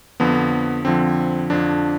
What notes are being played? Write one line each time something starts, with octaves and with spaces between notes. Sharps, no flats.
F2 D3 F3 B3
F2 D3 F3 C4
F2 D3 F3 D4